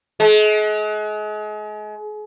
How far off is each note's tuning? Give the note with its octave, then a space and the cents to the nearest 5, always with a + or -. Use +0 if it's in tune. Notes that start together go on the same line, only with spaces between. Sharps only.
G#3 +35